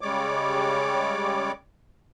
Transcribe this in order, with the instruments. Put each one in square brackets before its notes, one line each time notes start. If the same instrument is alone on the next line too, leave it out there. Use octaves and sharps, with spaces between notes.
[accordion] C#3 G3 G#3 C#5 D5 D6